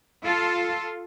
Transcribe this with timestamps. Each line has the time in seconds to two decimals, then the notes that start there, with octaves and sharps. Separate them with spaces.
0.23 F4 A4